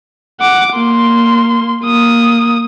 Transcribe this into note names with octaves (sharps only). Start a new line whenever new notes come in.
F#5 D6
A#3 C6
A#3 D#6